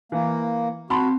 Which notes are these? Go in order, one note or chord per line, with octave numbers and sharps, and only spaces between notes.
E3 A#3
C4 F#4 A5 B5 C6